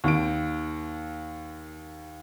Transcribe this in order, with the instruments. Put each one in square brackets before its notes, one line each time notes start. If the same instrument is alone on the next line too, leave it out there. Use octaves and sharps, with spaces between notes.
[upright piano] D#2 D7